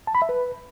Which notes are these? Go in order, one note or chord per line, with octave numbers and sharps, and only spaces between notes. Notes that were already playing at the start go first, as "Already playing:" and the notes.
A5
B5
E5
B4